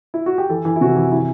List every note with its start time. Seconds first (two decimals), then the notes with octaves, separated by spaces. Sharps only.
0.14 E4
0.26 F#4
0.38 G4
0.49 E3 A4
0.65 E3
0.76 E4
0.81 C3 F#4
0.96 E3
1.12 E3 E4